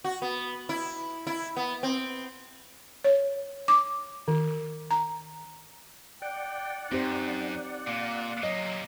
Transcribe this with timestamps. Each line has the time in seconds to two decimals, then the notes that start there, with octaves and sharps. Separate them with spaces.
0.04 F#4
0.22 B3
0.69 E4
1.27 E4
1.57 B3
1.83 C4
3.04 C#5
3.68 D6
4.28 D#3
4.91 A#5
6.22 D5 F#5 G5
6.92 F#2 C4 D#4 G4 C5
7.87 A#2 A#3
8.43 C3 F#3 A#3 D#5